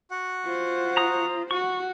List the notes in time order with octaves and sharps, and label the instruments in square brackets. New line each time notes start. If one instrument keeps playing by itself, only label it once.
[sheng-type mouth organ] F#4 F#5
[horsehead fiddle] F4 C5
[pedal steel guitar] A#5 D#6
[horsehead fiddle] F#4 [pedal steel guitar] C#6